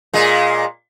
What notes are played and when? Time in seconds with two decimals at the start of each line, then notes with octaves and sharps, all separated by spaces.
0.13 A#2 G#3